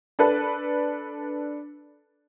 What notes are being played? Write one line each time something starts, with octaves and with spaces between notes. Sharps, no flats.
D4 A4 B4 A5